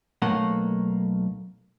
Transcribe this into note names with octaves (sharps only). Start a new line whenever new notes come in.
B1 A3 A#3 F#5